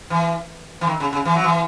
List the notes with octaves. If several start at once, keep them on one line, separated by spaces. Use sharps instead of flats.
E3
E3
D#3
C#3
C#3
E3
F#3
E3